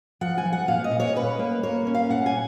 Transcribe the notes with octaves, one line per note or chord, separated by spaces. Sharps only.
F3 F#5
G#5
F3
F#5
A#2 F5
D#5
A#2
C#5
C#4 B4
A#3
A#3 C#5
C#4
F5
A#2 F#5
G#5